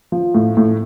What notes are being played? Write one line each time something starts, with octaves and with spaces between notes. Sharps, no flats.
F3
A2
A2